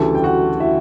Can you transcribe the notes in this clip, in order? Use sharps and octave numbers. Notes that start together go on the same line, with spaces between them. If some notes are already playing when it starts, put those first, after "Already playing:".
Already playing: D2 C#3 E3 G3 A4 A5
G5
F#4 F#5
E4 E5